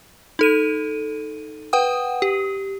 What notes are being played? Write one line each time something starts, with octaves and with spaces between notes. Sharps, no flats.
D#4 A4 D#7
B4 F#5 G5 D#6
G4